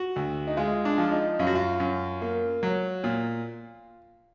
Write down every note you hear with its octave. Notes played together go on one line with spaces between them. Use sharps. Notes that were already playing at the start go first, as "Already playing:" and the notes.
Already playing: F#4
D2
D#4
G#3 F4
D4
F3
D#4
F#2 F4
F#4
F4
F#2
A#3
F#3
A#2